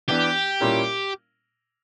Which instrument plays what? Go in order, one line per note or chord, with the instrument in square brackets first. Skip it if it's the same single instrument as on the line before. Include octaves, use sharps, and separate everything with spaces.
[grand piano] E3 B3 D4 [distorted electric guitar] G4
[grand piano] A#2 G3 C#4 E4 A#4